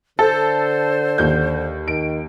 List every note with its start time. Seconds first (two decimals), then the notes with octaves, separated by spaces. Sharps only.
0.19 D3 A4 C5
1.18 D#2 G6
1.88 D#3 D7